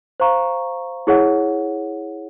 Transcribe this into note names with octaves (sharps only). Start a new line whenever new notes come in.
C5 F5 A#5 C#6
E4 G#4 C#5 F#5